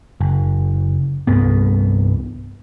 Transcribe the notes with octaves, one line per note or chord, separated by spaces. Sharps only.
F#1
C2 G2 B3